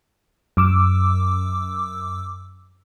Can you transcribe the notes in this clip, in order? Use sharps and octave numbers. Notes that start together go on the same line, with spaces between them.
F#2 D6 E6